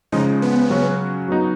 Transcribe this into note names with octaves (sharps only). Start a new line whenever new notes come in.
C#3 F3 G#3 D#4
B3
C#3 F#3 C#4 F#4
F#3 B3 D#4 F#4